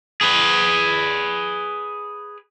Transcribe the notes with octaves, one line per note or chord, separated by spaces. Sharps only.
G#4 B4